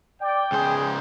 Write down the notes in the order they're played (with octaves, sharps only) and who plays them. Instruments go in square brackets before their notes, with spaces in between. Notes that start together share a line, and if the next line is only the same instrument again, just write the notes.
[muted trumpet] D5 [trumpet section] G5
[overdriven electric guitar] C#2 C5 [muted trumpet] G#4